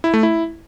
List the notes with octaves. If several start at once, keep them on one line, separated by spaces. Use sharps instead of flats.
E4
A3
E4